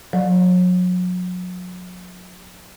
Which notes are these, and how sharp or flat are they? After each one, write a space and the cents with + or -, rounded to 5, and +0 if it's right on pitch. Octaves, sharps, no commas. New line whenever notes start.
F#3 -35 D5 +25